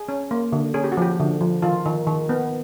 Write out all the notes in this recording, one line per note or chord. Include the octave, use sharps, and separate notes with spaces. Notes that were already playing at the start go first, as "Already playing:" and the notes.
Already playing: G#4
C#4
A#3
D3
C#4 G#4
G4
F#4
F3 G4
D3
F3
D#3 F4
D#3
D#3
B3